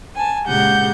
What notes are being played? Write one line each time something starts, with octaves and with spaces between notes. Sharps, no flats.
G#5 A5
A#2 C#3 G#3 G4 F#5 G6